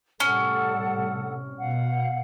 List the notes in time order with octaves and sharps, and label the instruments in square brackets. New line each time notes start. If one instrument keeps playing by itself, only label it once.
[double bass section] A2 C3 G3 [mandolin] C#4 [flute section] A4 F#5
[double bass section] B2 [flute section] F5 F#5